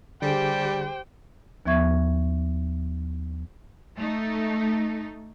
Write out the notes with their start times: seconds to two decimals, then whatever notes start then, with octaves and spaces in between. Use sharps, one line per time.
0.22 D3 G3 G4 G#4 C5 G5
1.66 D#2 F3 B3 E5 C#6 G#6
3.97 A3 D#4